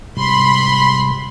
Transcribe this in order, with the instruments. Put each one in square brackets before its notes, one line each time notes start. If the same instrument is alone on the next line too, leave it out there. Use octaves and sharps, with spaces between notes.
[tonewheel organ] G#2 C3 G3 [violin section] B5 C6